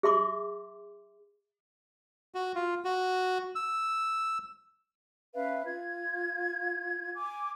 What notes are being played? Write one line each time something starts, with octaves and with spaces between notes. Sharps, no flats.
G#4 E5 C6 D6
F#4
F4
F#4
E6
C#4 B4 E5 F5
F4 G#6
G#5 D6